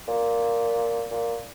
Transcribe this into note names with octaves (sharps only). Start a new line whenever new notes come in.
A#2
A#2